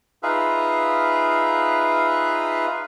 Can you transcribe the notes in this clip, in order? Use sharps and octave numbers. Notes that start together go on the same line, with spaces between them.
D#4 F4 G#4 B4 E5 F5